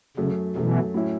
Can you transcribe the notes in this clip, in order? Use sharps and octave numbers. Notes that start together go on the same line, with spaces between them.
F#2 C#3 F#3 A3
F#2 B2 E3 F#3 A3
A2 F#3 C#4 E4